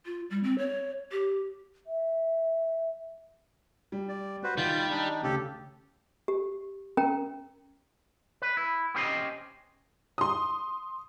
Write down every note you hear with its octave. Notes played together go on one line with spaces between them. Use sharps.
F4
G3
C4
C#5
G4
E5
G3
D5
F#4 B4 C5
D#3 G3 F4 G6
D4 D#4
D2 C#3 G4 A4
G4
C#4 A#4 G5 A#5
B4
E4
B3 C#4 G4 C5 D#5
C6 D#6